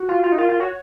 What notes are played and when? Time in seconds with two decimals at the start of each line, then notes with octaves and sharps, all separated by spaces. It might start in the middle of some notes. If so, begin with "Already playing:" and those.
Already playing: F#4
0.09 F4
0.23 F4
0.32 D#4
0.37 F4 A#4
0.49 F4
0.60 F#4 C#5